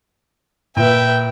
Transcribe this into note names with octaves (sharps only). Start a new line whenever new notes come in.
A#2 B4 E5 G5